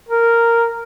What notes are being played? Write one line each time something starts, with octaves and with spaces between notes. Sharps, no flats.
A#4